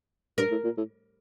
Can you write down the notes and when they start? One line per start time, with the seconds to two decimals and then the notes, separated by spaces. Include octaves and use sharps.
0.38 G2 A#4
0.51 A2
0.64 A#2
0.77 A2